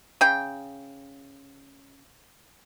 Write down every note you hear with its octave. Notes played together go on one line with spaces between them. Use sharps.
C#3 G5